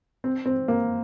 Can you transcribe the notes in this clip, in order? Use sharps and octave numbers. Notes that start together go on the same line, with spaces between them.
C4
C4
A#3